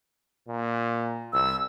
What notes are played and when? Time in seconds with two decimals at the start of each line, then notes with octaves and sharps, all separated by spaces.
0.48 A#2
1.33 C2 E6